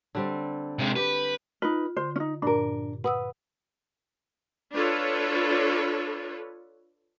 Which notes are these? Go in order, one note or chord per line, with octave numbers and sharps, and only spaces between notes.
D3 G3 C4
C3 G#3
G4 B4
D#4 F4 B4
D3 C5
C#4 D#4
G2 A#2 D4 A#4
B4 F#5 D#6 E6
D4 F4 A4 B4 C#5